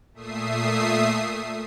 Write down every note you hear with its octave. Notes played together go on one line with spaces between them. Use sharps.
A#2 A3 E5 D#6 C7